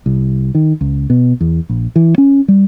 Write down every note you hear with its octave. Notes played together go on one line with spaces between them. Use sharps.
C2
D#3
C#2
B2
E2
A#1
E3
C#4
G3